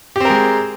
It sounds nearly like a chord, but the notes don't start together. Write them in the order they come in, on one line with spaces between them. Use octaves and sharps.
G4 C4 A#4 G#3